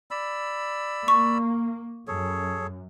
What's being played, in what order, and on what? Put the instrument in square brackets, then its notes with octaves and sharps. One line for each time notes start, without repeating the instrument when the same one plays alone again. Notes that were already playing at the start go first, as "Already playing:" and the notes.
[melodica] D5 B5 E6
[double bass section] A#3 [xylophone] C#6
[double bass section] F#2 [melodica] G#4 A4 C#5